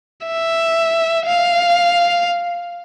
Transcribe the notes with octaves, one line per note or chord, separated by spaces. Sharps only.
E5
F5